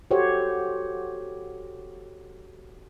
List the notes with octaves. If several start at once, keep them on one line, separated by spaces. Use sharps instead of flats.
F#4 G4 A4 C5 C#5